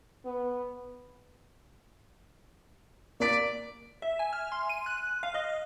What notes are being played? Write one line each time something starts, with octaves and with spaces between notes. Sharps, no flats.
B3
A#3 D5 B6
E5
G#5
F6
C6
D#7
F#6
F5
D#5